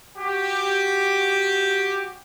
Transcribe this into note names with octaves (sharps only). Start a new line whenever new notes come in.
F#4 G4